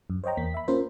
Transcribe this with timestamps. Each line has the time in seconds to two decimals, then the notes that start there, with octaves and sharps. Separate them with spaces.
0.10 F#2
0.24 C5 C#5 D#5 G5 A#5
0.37 E2 A#3 B6
0.54 E5 B5
0.68 A#3 C#4 F4 A#4 C5